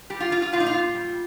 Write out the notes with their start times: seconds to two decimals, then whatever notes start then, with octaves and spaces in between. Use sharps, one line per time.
0.10 G3 G4
0.20 F4
0.32 G3 F4
0.42 F4
0.53 A#2 F4
0.60 D#4
0.66 F4
0.74 A#2
0.95 G3